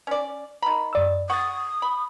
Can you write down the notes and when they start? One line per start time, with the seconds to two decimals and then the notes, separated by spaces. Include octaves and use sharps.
0.07 C#4 D5
0.62 D#3 A#5 B5
0.93 F#2 D5 E6
1.30 F#5 C#6 D#6 A6
1.82 B5